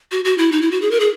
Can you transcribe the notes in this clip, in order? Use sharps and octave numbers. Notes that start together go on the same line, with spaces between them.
F#4
F#4
E4
D#4
E4
F#4
G#4
A#4
G#4